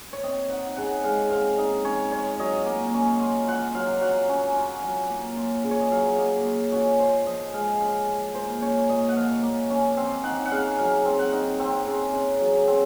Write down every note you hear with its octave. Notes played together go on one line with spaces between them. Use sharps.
C#5
C4 D#5
D#4 F#5
C#3 F#5
G#3 F5
C4 F5
D#4 D#5
C#4 C#5
F4 C#5
F#3 D#5
A#3
C#4
F4
F4 F#5
F#3 F5
F#3 F#5
C#4
F4
F#3
A#3
F4
C#3
C#5
D#5
F#3 F5
C#5
A#3 D#5
F4
C#4 F#4
F4 C5
F3 D#5
G#3 F5
C#4
F4
A#3 C5
C#4 C#5
A#2 D#5
F#5
F3 F5
A#3
C#4
C4 F5
D#4 F#5
F#5
C#3 F5
F#3 F5
C4
F#5
D#4
C4
C#3
C#3
F#3
C4